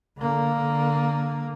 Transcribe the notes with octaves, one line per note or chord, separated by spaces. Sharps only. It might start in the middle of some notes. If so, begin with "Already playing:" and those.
D3 A#3